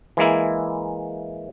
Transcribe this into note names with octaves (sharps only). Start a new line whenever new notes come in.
E3 G#3 A#3 E4